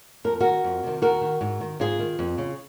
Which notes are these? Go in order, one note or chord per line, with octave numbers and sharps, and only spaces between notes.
F2 A#4
D#3 F#4 A#4
F2
C3 D#3
D#2 F#4 A#4
D#3
G#2
D#3
G#2 F4 G#4
D#3
F2
C#3